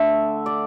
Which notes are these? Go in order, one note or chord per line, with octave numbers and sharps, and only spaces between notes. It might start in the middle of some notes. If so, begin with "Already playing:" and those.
Already playing: D3 A3 E5
D5